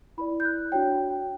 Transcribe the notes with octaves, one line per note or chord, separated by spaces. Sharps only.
E4 B4 D5 B5
G6
F#6
D4 F#4 C#5 G5